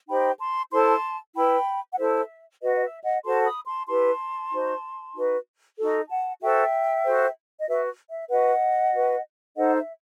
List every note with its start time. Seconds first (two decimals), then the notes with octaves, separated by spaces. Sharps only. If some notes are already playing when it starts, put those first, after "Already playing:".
0.08 D#4 G4 C5 G5 B5
0.40 A5 C6
0.72 E4 A4 C5 A5 C6
1.35 E4 B4 G5 B5
1.92 F#5
1.98 E4 A4 C5 E5
2.61 F#4 B4 D#5
2.77 D#5
2.83 E5
3.03 D#5 F#5
3.24 F#4 A4 C5 A5 C6
3.45 B5 D#6
3.67 A5 C6
3.88 E4 G4 B4 A5 C6
4.51 D#4 F#4 C5
5.14 D#4 F#4 B4
5.78 D#4 F#4 A4
6.09 F#5 A5
6.41 F#4 A4 C5 E5 G5
7.05 F#4 A4 C5
7.60 D#5
7.67 F#4 B4 E5
8.10 E5
8.30 F#4 B4 D#5 F#5
8.94 F#4 B4
9.57 D#4 A4 C5 D#5 F#5
9.78 E5